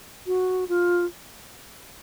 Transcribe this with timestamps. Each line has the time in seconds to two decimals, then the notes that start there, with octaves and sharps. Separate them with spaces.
0.27 F#4
0.69 F4